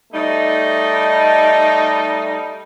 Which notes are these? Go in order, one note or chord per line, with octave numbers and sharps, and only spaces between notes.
G3 A3 D#4